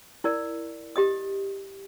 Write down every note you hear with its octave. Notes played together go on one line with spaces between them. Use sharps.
E4 A#4 D5
G4 D#5 D#6